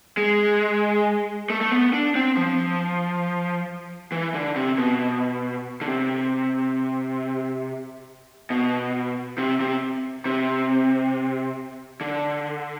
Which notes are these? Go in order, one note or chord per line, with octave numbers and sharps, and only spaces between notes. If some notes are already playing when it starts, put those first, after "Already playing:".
G#3
A3
A3
B3
D4
C4
F3
E3
D3
C3
B2
D3
C3
B2
C3
C3
C3
D3